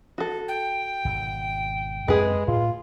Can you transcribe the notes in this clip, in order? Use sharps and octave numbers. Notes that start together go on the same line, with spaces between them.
F#4 A4
G5
G#1 B2
F#2 G#3 C4 G#4 B4
A2 F4